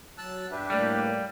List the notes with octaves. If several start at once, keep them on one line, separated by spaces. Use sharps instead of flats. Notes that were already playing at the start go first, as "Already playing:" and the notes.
F#3 A5 E6 F#6
E2 G2 D4 G4 B4 E5
A2 G3 A3 A#3 D5